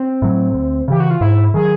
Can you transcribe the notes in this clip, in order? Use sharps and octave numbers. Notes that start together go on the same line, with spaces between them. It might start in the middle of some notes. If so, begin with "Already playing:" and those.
Already playing: C4
A2 F#3
D2
C#3 E3 G4
F#4
F4
G#2 E4
D#3 F#3 G#4